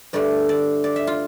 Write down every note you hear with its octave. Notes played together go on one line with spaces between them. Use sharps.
G2 D3 A3 D5
D5
D5
E5
F4